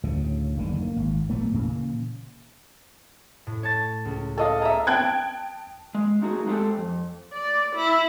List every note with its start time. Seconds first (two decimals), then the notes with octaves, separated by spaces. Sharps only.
0.04 D2 A2 C#3
0.57 F#1 D3 D#3
0.82 A#3
0.96 G#1
1.29 B1 A#2 A3 B3
1.54 A#2 C#3 E3 A#3
3.47 A2
3.63 C#5 A5 A6
4.05 C#2
4.37 A4 D#5 F5
4.62 G#4 E5 A#5
4.87 G5 A5 F#6 G#6
5.95 G#3
6.22 A3 D#4 F#4 G#4
6.47 G#3 C4 D4 G4 A4
6.77 F2
7.33 D5
7.75 E4